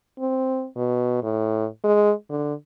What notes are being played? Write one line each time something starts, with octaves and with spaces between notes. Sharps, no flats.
C4
B2
A2
G#3
D3